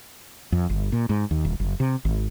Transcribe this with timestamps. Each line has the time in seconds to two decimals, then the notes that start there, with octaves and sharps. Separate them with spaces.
0.52 F2
0.70 G1
0.92 A#2
1.09 G#2
1.31 D#2
1.45 D#1
1.60 F#1
1.80 C3
2.05 G#1